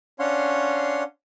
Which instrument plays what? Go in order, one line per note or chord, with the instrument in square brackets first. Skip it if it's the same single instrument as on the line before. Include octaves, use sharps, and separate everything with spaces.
[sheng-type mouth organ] C#4 D4 C#5 F5 F#5 C6